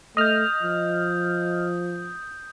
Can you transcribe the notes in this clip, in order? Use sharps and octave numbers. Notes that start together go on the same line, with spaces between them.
A3 D#5 D#6 F6 G6
F3